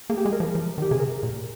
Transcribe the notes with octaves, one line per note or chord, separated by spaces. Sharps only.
A#3 G#4
G4
G#3 G#4
A#4
F3
F3
D#3
G4
C3 G#4
C#3 A#4
A#2